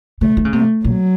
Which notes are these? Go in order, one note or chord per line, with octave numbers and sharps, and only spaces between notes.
C#3 A3
D#3
C#3
C3 A3
A#2 F#3